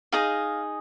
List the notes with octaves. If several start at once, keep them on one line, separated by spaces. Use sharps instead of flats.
D#4 G#4 D#5 F5